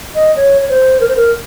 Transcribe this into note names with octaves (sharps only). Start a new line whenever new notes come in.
D#5
C#5
C#5
C5
A#4
C5
A#4